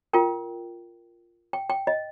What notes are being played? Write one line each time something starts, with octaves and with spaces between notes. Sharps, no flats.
F4 A#4 G5
G5
G5
D#5